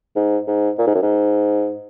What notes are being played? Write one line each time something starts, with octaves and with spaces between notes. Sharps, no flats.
G#2
G#2
A#2
G#2
F#2
G#2